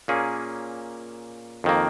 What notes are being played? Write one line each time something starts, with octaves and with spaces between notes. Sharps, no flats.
A#2 A#3 C#4 G#4
F2 D#3 A#3